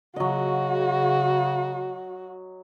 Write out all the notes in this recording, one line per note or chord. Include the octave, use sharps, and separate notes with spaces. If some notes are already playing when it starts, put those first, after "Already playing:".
C#3 F#3 F#4 D#5